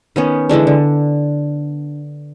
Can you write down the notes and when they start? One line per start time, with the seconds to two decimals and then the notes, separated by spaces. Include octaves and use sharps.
0.16 D#3 B3 C#4
0.49 D3 E3 G#3 D4
0.67 D3